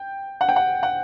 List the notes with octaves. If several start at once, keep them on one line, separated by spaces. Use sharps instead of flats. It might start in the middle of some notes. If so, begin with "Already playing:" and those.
Already playing: G5
F#5
G5
F#5
F#5